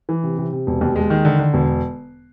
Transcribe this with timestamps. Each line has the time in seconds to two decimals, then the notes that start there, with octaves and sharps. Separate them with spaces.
0.09 E3
0.24 C3
0.38 C3
0.53 C3
0.67 E1
0.81 D#2
0.96 G#3
1.10 D#3
1.25 D3
1.39 D3
1.54 E1